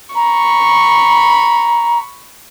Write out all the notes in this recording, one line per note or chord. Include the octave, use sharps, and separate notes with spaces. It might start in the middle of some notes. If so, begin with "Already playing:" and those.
A#5 B5 C#6